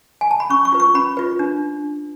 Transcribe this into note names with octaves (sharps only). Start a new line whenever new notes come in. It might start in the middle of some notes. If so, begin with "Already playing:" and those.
G#5
A5
B5
C#4 C#6
C#6
F4 B4
C#6
C#4 B5
F4 B4
D4